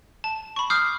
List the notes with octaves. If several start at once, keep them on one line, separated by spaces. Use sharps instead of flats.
A5
B5 C#6
D6 D#6 F6 G6 C7